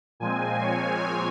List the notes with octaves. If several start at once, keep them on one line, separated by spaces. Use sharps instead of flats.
A#2 F3 G#3 C4 G#5
C#5